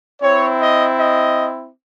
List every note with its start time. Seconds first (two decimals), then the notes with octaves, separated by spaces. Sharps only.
0.22 C4 E4 C#5
0.59 D#5
0.96 D#5